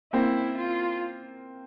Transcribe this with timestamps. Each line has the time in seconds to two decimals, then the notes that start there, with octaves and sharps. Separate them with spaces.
0.13 A#3 C4 E4
0.57 F4